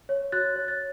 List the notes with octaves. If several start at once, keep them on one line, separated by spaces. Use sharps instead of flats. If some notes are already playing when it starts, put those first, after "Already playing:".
C#5
F#4 F#6 A6
C#5
A6